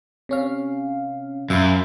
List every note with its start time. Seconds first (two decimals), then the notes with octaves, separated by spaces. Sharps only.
0.29 C3 C#4 F5
1.50 F#2 E5 F5 B5